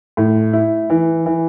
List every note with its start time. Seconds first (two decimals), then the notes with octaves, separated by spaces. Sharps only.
0.17 A2
0.53 E4
0.90 E3
1.26 E3